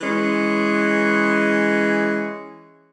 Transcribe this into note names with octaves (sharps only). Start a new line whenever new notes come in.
E3 G#3 C#4